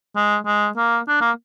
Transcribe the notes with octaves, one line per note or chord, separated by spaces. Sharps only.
G#3
G#3
A#3
D4
A#3